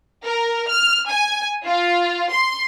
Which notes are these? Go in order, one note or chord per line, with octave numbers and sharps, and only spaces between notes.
A#4
F6
G#5
F4
C6